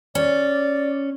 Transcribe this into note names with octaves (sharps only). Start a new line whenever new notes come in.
C#4 D5